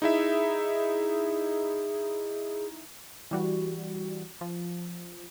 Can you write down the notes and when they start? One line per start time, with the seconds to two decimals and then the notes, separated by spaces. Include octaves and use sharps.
0.02 D#4 E4 G#4 E5
3.31 E3 G3 F#4
4.41 F3